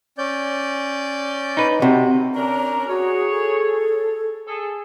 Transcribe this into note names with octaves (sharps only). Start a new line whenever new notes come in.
C#4 D5 G6
D#4 B4
C3 F#4
C#4 D4 A#4 A#5
F#4 G#4 C#5
A4
G#4 A4